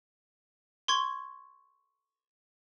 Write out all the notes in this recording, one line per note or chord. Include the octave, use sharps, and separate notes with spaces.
C6 C#6 G#6